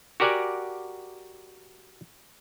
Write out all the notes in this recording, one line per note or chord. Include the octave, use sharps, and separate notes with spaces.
F#4 G4 A#4 D5 F#5 G#5